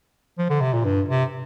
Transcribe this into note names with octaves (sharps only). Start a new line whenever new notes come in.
F3
D3
C3
A#2
G2
C3